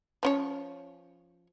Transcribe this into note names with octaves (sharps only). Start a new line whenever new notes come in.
F3 C#4 C#5